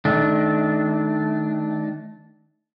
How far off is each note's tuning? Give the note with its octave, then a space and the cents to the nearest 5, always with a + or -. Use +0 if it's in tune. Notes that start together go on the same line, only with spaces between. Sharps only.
D#3 +0 A3 -30 D4 -10